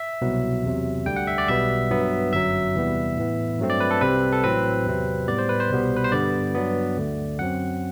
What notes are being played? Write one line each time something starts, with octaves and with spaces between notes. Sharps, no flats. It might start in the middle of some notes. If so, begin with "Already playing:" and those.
Already playing: E5
C2 B2 F#3 B3
E2 C3 F#3
D2 D3 G3 G5
F#5
E5
D5
B1 B2 G3 B3 E5
G2 F#3 B3
G1 F#2 F#3 E5
E2 C3 E3 G3 B3
A2 E3 B3
G2 F#3 A3 C4
D5
B4
A4
C2 C3 G3 C4 B4
A4
A1 A2 F#3 C4 B4
E2 C3 F#3 C4
A2 G3 B3 D5
C5
B4
C5
C2 B2 G3 B3
B4
C5
G2 D3 G3 B3 D5
G2 F#3 B3
D2 D3 A3
F#2 F#3 C4 F#5